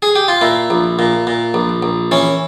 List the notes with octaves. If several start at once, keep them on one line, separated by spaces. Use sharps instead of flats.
G#4
G4
F4
A#2 E4
A#1
A#2
A#2
A#1
A#1
E3 C#4